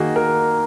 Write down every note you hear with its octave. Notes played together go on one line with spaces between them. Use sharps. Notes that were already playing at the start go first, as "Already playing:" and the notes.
Already playing: D#3 A#3 D#4 F#4 G#4
A#4